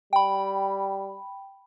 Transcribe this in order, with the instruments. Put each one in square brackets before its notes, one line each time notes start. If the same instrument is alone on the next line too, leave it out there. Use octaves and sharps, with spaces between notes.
[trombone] G3 [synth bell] G5 B5